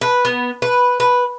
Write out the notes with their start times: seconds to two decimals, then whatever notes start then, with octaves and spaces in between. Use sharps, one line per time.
0.01 B4
0.25 B3
0.62 B4
1.00 B4